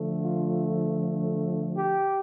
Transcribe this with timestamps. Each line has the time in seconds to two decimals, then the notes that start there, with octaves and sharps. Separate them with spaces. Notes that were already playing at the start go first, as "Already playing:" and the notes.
Already playing: D3 F3 A3
0.22 F4
1.78 G4